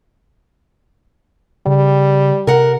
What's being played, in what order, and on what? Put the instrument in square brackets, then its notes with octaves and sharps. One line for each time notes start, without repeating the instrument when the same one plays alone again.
[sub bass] C#3 [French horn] G3
[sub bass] C3 [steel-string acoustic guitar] A#4 F#5